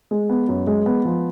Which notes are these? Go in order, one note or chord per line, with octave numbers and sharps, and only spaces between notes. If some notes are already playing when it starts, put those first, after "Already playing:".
G#3
B3
F#2
G#3
B3
F3